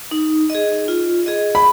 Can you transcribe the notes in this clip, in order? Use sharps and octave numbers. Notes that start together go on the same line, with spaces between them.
D#4
G#4 D#5
F4
G#4 D#5
B5